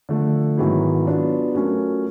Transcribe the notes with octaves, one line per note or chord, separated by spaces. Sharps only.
D3 F3 A3
G#2 D#3 F#3 B3 E4
F#3 B3 D4 F4
F#3 A3 C#4 F4 A#4